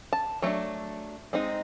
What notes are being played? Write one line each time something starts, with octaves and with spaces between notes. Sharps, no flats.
A5
F#3 A3 D4
G#3 C4 D#4